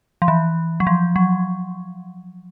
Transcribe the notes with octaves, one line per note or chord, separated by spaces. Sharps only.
F3
E3
F#3
F3
F#3